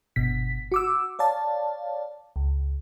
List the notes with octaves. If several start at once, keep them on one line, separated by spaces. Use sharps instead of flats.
G1 B2 B6
F#4 D6 E6
C#5 D5 F5 A5
C#2